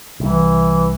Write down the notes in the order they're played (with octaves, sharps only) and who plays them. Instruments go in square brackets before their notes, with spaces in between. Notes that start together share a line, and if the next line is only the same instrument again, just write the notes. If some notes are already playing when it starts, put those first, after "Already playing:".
[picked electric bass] C2 [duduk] E3